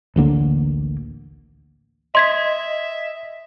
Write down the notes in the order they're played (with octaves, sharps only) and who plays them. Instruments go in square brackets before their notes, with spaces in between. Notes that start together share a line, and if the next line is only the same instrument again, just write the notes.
[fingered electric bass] A1 D2 D3 A#3
[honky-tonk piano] D#5 [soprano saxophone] E5 [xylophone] C6 G#6 B6